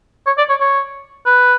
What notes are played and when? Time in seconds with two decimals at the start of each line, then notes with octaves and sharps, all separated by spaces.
0.27 C#5
0.38 D5
0.50 C#5
0.61 C#5
1.26 B4